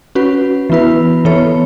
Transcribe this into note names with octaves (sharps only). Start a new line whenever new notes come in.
C#4 F#4 B4
E3 B3 E4 B4
E3 B3 A4 C#5